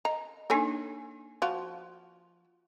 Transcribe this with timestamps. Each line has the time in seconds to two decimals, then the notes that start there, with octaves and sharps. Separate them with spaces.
0.05 D#5 A#5
0.50 A#3 D4 D#4 A4 C#5 G#5
1.42 F3 F4 F#4